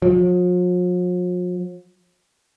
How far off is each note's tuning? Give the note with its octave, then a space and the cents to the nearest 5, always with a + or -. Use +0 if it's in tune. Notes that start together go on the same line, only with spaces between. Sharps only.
F3 +45